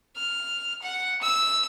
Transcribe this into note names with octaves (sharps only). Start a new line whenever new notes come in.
F6
F#5
E6